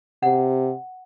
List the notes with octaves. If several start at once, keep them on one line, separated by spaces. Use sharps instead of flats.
C3 F#5